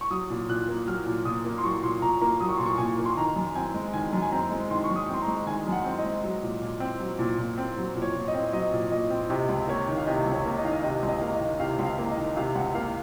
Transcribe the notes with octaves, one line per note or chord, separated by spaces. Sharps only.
C#6
F#3 D#6
A#2
A#2 F#6
A#3
F#3 F6
A#2
A#2 D#6
A#3
C6
F#3 C#6
A#2 C6
A#2 A#5
A#3 A#5
F#3 D#6
C#6
A#2 C6
C#6
A#2 G#5
A#3
C6
D#3 A#5
F#2
C4 G#5
G#3
D#3 G#5
F#2
G#5
C4 A#5
G#3
D#3 C6
C#6
F#2
D#6
C4
C6
A#5
G#3
D#3 G#5
F#2
F#5
C4
D#5
G#3
F#3
A#2
A#2
C4
F#3
A#2
A#2
C4
F#3
A#2
C#5
A#2
D#5
C4
F#3 D#5
A#2
A#2 D#5
C4
C3 D#5
C#2
A#3 C#5
D#3
F5
C3 D#5
C#2
C#5
A#3
D#5
D#3 F5
D#5
C3 D#5
C#2
D#5
A#3 F5
D#5
D#3
C3 F5
C#2
F5
A#3
D#5
D#3
C3 F5
C#2 F#5
A#3 F5